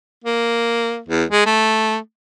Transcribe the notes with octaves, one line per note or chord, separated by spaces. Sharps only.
A#3
E2
G#3
A3